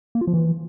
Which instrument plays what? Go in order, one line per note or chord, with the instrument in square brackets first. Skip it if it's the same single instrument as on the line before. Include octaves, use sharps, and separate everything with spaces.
[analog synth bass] A#3
F4
F3
E3